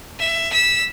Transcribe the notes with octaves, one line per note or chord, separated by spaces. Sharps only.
E5
E6 B6